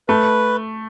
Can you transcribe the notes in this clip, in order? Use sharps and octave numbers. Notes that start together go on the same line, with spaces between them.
A3 B4